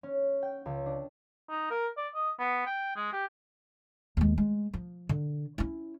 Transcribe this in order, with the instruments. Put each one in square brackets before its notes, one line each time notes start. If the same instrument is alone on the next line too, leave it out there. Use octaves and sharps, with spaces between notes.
[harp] C#4
G5
C#2
D4
[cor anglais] D#4
A#4
D5
D#5
B3
G5
G#3
G4
[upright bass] D#2 G#3
G#3
F3
D3
C#4 E4